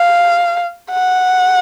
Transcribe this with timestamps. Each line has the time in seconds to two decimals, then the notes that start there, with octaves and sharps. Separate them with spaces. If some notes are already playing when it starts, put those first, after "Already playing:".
Already playing: F5
0.90 F#5